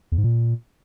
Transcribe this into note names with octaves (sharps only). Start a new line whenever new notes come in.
E2
G#2
A#2